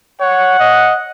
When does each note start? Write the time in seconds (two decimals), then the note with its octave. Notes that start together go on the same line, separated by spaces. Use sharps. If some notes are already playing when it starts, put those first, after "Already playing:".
0.21 C#5 F#5
0.59 D#5